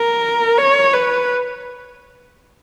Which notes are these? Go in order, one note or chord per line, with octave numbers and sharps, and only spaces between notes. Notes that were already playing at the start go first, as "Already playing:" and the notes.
Already playing: A#4
C#5
B4